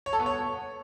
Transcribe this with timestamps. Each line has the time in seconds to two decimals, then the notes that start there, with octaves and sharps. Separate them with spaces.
0.06 C#5
0.13 A4
0.19 B3
0.26 C#5